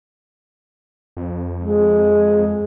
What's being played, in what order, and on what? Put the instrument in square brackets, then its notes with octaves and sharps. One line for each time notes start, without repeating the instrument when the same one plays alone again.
[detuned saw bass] F2
[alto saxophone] G#3